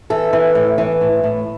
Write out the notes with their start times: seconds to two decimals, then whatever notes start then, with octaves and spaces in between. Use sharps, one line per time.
0.10 E3 A4
0.33 E3
0.55 A2
0.78 E3
1.01 A2
1.24 A2